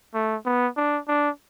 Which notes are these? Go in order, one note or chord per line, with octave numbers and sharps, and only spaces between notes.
A3
B3
D4
D4